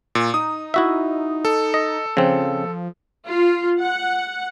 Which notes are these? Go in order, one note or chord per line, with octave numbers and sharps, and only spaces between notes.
A#2
D#4 D#6
E4 F#4 E5
A4
D#5
C#3 F3 C4
F4
F#5